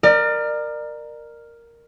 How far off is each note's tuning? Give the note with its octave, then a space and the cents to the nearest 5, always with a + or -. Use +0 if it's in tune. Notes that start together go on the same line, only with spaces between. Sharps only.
A#4 +0 D5 +35